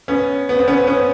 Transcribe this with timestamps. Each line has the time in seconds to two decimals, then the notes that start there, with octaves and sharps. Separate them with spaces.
0.08 B3 C#4
0.49 B3
0.59 C4
0.68 B3 C#4
0.87 B3 C#4